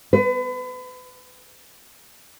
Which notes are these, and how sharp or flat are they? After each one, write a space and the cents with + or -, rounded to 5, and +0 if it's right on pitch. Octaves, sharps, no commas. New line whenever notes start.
B4 +35